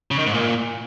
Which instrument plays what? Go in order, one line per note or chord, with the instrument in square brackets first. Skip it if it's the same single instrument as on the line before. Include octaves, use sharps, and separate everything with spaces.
[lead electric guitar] C#3
D#3
G#2
A#2